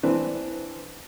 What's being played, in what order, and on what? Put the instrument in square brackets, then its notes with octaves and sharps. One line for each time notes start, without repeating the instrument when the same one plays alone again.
[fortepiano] E3 C4 D4 B4